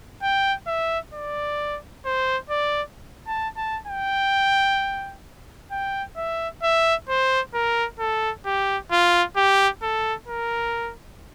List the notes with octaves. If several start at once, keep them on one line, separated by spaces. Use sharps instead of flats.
G5
E5
D5
C5
D5
A5
A5
G5
G5
E5
E5
C5
A#4
A4
G4
F4
G4
A4
A#4